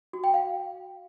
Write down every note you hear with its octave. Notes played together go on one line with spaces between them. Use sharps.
F#4
G5
F5